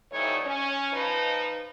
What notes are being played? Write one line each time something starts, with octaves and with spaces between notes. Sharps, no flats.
F2 E3 G3 A3 D#4 C#5
C#4
F3 D#4 B4